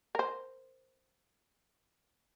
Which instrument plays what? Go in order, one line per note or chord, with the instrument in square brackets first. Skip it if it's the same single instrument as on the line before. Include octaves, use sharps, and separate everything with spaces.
[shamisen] A#4 C5